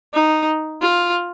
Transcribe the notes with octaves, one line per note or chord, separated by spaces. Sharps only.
D#4
F4